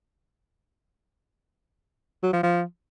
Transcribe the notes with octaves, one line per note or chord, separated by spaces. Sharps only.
F#3
F3
F3